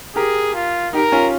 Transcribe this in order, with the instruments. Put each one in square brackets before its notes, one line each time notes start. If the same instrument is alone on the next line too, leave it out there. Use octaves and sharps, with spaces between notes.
[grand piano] G4 A#4 [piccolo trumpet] G#4
[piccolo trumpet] F4
[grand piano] D#4 G4 [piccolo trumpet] A#4
[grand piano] C#4 F4